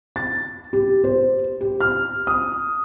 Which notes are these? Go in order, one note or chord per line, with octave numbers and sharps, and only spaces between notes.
A6
G4
C5
G4
F6
D#6